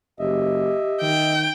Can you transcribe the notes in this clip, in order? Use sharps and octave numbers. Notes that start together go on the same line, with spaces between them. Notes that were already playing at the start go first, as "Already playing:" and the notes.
F#1 G4 D#5 E5
D#3 G5